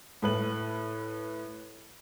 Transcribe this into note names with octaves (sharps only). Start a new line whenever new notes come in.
A2 B4 F#7